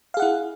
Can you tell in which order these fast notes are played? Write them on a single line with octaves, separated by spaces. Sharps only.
F5 G#4 F#5 E4